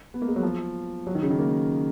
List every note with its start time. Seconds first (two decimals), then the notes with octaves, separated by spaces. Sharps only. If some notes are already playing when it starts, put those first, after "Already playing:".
0.14 B3
0.22 A#3
0.28 G#3
0.36 F#3
0.43 F3
1.07 F#3
1.15 D#3
1.22 C#3
1.30 D#3
1.39 A#3